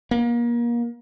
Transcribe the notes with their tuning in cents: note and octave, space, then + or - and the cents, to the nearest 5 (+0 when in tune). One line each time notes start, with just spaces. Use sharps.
A#3 +30